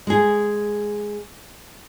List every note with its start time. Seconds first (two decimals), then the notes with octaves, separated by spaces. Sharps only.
0.07 G#3 G#4